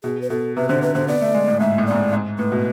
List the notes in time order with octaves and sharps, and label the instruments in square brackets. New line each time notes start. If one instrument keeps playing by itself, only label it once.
[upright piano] B2 [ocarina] G#4
[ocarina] B4
[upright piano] B2 [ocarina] A4
[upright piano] C3 [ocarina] B4
[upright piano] D3 [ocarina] C5
[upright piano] C3 [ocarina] B4
[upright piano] D3 [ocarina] C5
[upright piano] B3 [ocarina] D5
[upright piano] A3
G#3
A2
[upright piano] G#2 [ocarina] E5
[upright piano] A2
[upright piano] G#2 [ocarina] D5
[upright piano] A2
G#2
[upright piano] A2 [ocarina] B4
[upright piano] B2